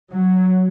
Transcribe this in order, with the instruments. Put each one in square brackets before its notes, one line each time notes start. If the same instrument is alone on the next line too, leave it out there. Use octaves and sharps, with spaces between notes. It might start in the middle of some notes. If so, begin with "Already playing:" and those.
[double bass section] F#3